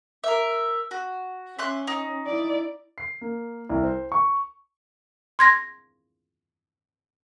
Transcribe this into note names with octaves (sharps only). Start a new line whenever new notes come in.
A#4 E5
F#4
C#4 E5 C6 F#6
D#4
E4 D5
C7
A#3
C2
C5
C#6
C6 G#6 A#6